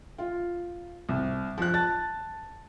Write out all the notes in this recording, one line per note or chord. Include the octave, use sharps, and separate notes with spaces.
F4
C2
F3 F#6
A5 A6